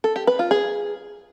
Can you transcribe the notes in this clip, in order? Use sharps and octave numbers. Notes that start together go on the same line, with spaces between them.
A4
G4
B4
F4
G#4